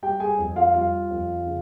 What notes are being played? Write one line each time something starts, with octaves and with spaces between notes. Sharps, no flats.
G3 G4 G5
G#4 G#5
F2
F4 F5
G3 F4 F5
F2
C#3